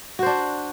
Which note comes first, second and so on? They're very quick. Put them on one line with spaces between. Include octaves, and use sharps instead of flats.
F#4 C5 D4